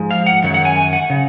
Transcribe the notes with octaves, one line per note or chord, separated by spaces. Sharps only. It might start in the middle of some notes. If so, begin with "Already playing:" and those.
Already playing: G#2 F3 G#3
F5
F#5
F#2 D#3 F#3 F#5
F#5
G#5
G#5
F#5
C#3